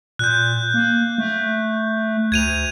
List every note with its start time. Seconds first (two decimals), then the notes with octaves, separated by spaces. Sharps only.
0.19 A#2 F#6 G6
0.74 A#3
1.18 A3
2.32 D2 G#6 D#7 F7